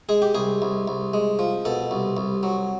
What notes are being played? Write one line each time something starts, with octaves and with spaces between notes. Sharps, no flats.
G#3 G#4
G4
C2 G#4
C2
C2
G#3
F3
B2 A4
C2
C2
F#3